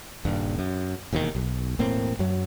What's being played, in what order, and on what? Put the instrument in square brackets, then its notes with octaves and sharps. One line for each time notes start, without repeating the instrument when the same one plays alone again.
[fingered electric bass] D#1 G2
F#2
E1 D#2 B2 D#3
B1
E1 A2 A#3 C4
F#2 F#3